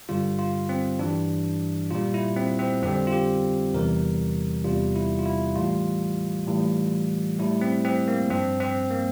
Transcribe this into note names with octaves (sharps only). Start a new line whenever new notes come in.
G2 D3 G3 F4
F4
C4
G2 E3 G3 D4
A#2 G3 F4
E4
C4
C4
F2 D3 G3 C4
F4
G4
E2 C3 E3 G3 A#4
E2 C3 G3 F4
E4
F4
E4
A2 E3 G3 F4
A2 E3 G3
A2 G3 E4
C4
C4
A#3
G2 F3 C4
C4
A#3